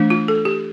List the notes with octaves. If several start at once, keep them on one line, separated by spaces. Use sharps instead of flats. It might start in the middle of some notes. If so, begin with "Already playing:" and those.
Already playing: E3 A3 D4
F4
A4
G4